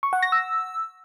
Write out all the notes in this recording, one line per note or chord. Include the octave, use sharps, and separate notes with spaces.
C#6
F#5
A#6
E6